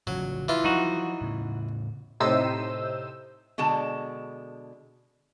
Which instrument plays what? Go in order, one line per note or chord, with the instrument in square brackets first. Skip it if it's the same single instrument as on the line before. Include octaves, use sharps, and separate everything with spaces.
[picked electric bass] A1 C#3 F3 [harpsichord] F#3
[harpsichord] E3 F4
[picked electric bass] F3 F#3 [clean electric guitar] D#4 F#4
[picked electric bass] A2 C#3
[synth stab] A2 C3 D#4 C5 E6 D#7
[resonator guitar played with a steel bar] B2 D3 G#3 A5